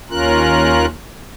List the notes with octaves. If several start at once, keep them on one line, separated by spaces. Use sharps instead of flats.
D#2 C#4 F4 A#4 F#6